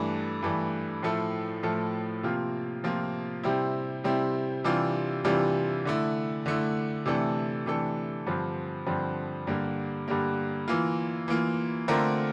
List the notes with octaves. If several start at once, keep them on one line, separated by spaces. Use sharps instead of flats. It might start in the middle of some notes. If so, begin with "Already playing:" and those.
Already playing: G2 E3 A3 D4
G2 E3 A3 D4
A2 F3 A3 E4 A4
A2 F3 A3 E4 A4
C3 F3 A#3 F4
C3 F3 A#3 F4
C3 G3 C4 E4
C3 G3 C4 E4
C3 E3 G3 D4 F4
C3 E3 G3 D4 F4
D3 A3 E4
D3 A3 E4
C3 E3 A3 D4 A4
C3 E3 A3 D4 A4
G2 D3 F3 C4
G2 D3 F3 C4
G2 D3 G3 A#3
G2 D3 G3 A#3
E3 A#3 F4
E3 A#3 F4
D3 A3 C4 F4 A#4